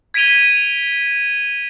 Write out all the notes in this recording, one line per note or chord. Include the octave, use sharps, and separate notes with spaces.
G#6 B6 D7 D#7 F7 G7